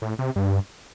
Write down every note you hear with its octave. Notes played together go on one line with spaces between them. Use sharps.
A2
C3
G2